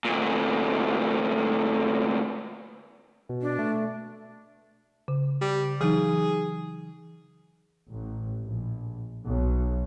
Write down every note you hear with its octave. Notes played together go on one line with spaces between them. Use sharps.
D2 A#2
B2
D4
A3
C#3
G3
E3 F#3 D#4 G#4
A1
A#1
B1